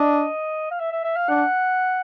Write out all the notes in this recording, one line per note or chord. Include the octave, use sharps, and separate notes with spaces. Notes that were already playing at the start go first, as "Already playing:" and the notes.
Already playing: D4 D#5
F5
E5
E5
E5
F5
D4 F#5